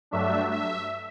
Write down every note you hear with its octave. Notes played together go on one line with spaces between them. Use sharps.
G2 F#3 A3 D4 E5
E5